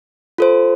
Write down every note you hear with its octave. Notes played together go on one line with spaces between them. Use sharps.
F4 A4 C5